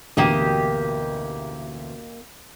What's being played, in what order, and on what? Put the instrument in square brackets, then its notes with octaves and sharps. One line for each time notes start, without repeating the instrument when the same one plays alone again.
[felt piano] A1 D2 B2 [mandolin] A#3 G4 D#5